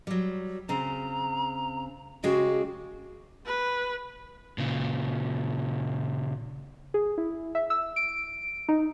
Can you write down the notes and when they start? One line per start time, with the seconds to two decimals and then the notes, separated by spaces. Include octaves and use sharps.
0.07 F#3 G3
0.69 C#3 C4 A#5
2.23 C#3 G#3 F#4 G4
3.46 B4
4.58 A#2 C#3
6.94 G#4
7.18 E4
7.55 E5
7.70 E6
7.96 D7
8.69 D#4